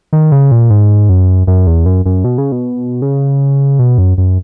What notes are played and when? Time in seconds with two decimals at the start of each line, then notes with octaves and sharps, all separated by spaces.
0.13 D#3
0.32 C#3
0.51 A#2
0.70 G#2
1.09 F#2
1.47 F#2
1.67 E2
1.86 F#2
2.06 F#2
2.24 B2
2.38 C#3
2.52 B2
3.02 C#3
3.79 B2
3.98 F#2
4.18 F#2